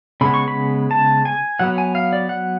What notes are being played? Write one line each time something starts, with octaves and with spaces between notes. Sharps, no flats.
C#3 G#3 B3 B5
C#6
B5
A5
G#5
F#3 B3 F#5
G#5
F5
D5
F#5